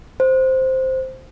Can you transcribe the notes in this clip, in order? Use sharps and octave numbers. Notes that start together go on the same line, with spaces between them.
C5